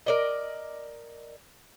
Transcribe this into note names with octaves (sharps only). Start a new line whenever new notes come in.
A#4 D5 D#5